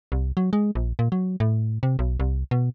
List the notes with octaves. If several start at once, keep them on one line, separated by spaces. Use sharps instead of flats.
C2
F#3
G#3
A#1
A#2
F#3
A2
C3
B1
C2
B2